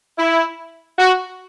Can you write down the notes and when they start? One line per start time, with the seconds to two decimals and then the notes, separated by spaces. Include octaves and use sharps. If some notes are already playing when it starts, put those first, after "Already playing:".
0.18 E4
0.99 F#4